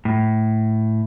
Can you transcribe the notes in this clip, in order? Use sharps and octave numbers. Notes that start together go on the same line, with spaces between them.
A2